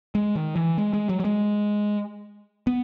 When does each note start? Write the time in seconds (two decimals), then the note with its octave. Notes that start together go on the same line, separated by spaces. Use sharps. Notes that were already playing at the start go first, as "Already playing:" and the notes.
0.15 G#3
0.36 D#3
0.56 E3
0.78 G#3
0.93 G#3
1.09 F#3
1.20 F#3
1.25 G#3
2.67 B3